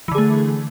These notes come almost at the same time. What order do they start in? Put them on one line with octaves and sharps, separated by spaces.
E3 D3 G#4 A3